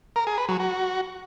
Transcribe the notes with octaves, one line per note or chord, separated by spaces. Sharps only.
A#4
G#4
B4
F#3
F#4